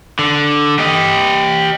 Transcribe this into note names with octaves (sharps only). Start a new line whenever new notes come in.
D3
G4 D#5